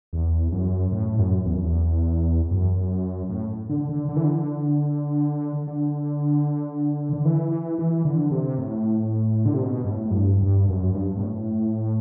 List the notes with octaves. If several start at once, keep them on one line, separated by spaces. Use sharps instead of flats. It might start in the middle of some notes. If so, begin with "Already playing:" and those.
E2
F#2
A2
F#2
E2
F#2
E2
F#2
A2
D3
D3
D3
E3
D3
D3
D3
E3
E3
E3
D3
C3
A2
D3
C3
B2
G2
A2
F#2
G2
G2
F#2
G2
B2
A2